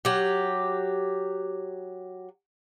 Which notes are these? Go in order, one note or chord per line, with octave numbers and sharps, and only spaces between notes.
F#3 G4